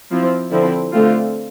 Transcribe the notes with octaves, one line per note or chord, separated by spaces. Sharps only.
F3 C4 E4
D3 F3 C4 E4
D3 A3 C4 F4